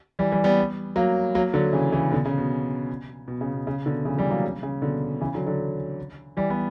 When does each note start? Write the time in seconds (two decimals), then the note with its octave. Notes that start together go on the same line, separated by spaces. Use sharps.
0.19 E3 G3
0.32 E3 G3
0.44 G3 B3
0.96 F#3 A#3
1.35 F#3 A#3
1.54 D3 F#3
1.73 C#3 E3
1.92 C#3 E3
2.11 B2 D3
2.25 C#3
2.38 B2
3.28 B2
3.41 C#3
3.54 B2
3.67 C#3
3.86 B2 D3
4.05 C#3 E3
4.18 E3 G3
4.30 F#3 A#3
4.44 C#3
4.63 C#3
4.82 B2 D3
5.21 C#3 E3
5.34 D3 F#3
5.46 D3 F#3
6.37 E3 G3
6.50 G3 B3